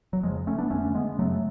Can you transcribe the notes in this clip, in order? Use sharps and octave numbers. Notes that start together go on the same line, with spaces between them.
F#3
F2 C#3 F3 G#3
A3 C#4
B3 D4
F2 D3 A3 C#4
G#3 B3
F#2 C#3 F#3 A3